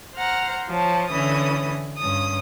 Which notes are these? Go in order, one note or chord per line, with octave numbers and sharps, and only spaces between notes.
C5 F#5 A#5 F6
F3 C#5 A5
D3 E3 C#4 D#6
G2 C#4 D#6